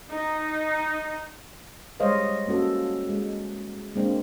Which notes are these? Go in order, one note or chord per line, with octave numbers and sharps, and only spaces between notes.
D#4
G3 G#3 C5 C#5 D#5 F5
A#3 C#4 F#4 A4
G#3
G#3 A#3 C4 D4